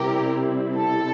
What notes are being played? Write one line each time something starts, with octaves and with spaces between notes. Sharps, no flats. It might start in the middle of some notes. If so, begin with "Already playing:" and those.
Already playing: C3 G3 C4 E4 G4 A#4
A4